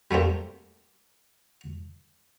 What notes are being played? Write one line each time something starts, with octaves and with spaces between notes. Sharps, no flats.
G3 A3 A#3 C4 G4